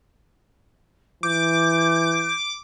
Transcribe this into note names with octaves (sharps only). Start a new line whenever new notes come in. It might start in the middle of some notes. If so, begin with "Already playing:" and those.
E3 D6 G6